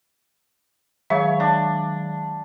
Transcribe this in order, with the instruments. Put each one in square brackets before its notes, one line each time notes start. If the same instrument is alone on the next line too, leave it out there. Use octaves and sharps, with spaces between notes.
[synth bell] D#3 F#3 G#3 [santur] C#5 [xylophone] E5 F5
[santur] D4 [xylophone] A5